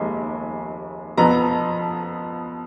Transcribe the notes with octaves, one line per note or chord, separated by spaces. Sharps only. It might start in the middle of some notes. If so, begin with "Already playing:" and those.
Already playing: F1 D#2 G#3
F2 F3 B3 A#5